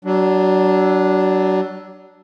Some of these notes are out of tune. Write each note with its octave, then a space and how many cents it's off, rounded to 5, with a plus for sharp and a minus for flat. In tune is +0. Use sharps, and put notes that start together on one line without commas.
F#3 +30 D4 +0